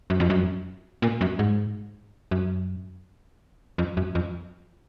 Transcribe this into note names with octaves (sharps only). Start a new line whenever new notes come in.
F#2
F2
F#2
A#2
F#2
G#2
F#2
F2
F#2
F2